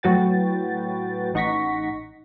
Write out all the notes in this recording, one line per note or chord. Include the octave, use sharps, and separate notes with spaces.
A2 F#3 F#4 B4 G5 A6
A1 D#4 F#5 C#6 A#6 B6